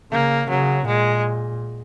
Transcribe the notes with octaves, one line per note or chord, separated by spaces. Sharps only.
C#3 A#3
C#3 F#3
A#2 G#3